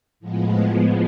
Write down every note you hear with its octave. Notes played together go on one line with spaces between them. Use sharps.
A2 F3 G#3 B3